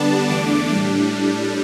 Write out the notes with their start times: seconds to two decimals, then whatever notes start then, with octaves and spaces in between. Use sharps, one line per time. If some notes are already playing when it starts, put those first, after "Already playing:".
Already playing: D3 G3 B3 D4 A5
0.30 E2 D3 A3 D4 D6
0.70 A2 G3 D4